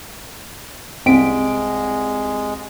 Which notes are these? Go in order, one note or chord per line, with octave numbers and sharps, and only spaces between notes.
C2 G#3 C4 B6 D7